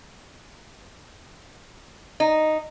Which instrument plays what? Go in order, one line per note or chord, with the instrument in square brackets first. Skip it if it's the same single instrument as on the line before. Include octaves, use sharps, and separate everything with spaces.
[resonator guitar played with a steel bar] D#4